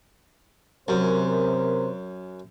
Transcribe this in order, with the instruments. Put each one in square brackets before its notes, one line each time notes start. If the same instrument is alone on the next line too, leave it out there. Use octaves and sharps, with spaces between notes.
[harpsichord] F#2 [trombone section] C3 A#4 C5